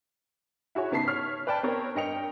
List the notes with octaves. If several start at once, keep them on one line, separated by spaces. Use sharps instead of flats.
E4 F#4 G#4 C#5
G#2 C#3 B3 A5 B6 C7
C#5 F6
B4 D5 G5 A5
B3 C4 A#4 C#5
G2 A#4 D#5 G5 C#7 F7